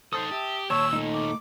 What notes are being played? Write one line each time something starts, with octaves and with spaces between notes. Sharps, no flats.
D#4 A4 C5 A5 D#6
G4 E5
D#2 A#2 C#5 A5 C#6 E6
A3 D#4
D6